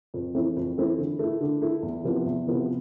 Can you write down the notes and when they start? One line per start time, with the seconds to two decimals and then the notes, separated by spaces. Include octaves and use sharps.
0.14 F2
0.35 E3 A3 C4 E4
0.57 F2
0.78 E3 A3 C4 E4
0.98 D3
1.19 A3 E4
1.41 D3
1.62 A3 E4
1.83 E2
2.04 C3 F3 B3 E4
2.26 E2
2.47 C3 F3 B3 E4